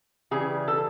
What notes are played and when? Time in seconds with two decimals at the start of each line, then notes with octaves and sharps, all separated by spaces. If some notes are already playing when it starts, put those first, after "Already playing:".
0.31 C#3 E3 G3 G#4
0.68 A4